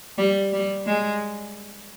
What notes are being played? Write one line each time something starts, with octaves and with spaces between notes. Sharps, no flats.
G3
G3
G#3